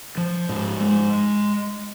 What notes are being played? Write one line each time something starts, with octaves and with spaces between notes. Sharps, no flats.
F3
G#2
G#3